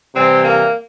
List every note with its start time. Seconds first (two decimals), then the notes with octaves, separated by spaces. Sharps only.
0.15 C3 E3 G3 C4
0.44 A#3